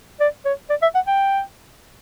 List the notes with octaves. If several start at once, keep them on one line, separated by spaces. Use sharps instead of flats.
D5
C#5
D5
E5
F#5
G5